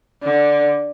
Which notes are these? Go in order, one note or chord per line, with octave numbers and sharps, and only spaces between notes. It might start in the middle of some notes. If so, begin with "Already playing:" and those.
D3